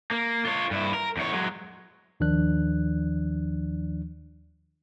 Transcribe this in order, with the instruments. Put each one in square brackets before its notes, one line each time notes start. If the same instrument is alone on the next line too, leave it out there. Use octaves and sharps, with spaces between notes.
[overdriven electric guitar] A#3
F4 C#5
G2 E4
A#4
E2 C#5
F#3 G#3
[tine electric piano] D#2 D#3 F3 D4 D5 F#6